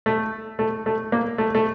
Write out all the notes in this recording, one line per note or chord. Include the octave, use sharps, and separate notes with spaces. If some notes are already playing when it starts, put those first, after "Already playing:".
A3
A3
A3
A#3
A3
A3